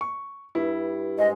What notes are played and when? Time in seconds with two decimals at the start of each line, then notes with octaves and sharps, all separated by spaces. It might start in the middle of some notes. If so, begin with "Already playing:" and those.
0.01 C#6
0.55 G2 E4
1.18 G#2 G#3 D#5